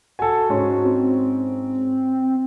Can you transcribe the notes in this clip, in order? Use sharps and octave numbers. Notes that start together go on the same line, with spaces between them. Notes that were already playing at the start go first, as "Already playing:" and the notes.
F#4 A4 G#5
G#2 C#4 C6
C4